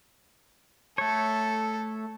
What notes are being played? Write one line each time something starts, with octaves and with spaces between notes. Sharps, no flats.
A3 A4 C#5